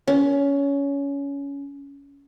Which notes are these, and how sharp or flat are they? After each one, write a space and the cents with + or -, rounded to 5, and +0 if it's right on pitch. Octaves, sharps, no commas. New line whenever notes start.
C#4 +20